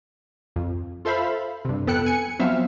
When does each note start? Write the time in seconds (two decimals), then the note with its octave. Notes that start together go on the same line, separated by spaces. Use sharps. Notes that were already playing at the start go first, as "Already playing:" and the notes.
0.56 F2
1.05 F4 A4 C5 E5 F5 B5
1.65 G2 C3
1.87 F2 B3 A4 G5 F#6 C#7
2.06 G#5 C#7
2.39 F3 F#3 B3 C4 E5 F5